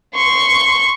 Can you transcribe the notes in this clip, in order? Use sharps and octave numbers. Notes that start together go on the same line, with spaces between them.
C6 C#6